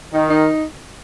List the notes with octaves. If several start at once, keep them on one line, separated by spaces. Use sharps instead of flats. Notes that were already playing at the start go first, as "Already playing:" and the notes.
D#3 D#4
D#4